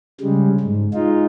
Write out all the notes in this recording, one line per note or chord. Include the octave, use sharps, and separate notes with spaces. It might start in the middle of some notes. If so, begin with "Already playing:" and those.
C#3 G3 G#3
G#2
G#3 D#4 F4